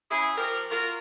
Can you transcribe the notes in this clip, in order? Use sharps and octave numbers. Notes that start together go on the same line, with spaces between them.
C#3 E4 G#4
F3 G4 A#4
F4 F#4 A#4